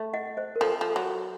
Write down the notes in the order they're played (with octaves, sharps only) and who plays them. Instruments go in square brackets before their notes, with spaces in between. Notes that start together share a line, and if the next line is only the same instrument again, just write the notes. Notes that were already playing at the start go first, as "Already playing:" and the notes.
Already playing: [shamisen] A3
[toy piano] D#5 F#5
C5 D#5
A#4
[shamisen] F3 [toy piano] A4
[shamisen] F3
[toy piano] A4
[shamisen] F#3 [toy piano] F#4